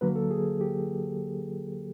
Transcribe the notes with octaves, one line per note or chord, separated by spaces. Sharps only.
D2 D3 F#3 A#3 B4
A4
G#4
G4